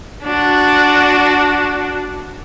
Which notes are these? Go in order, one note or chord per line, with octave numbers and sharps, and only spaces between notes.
D4 F#4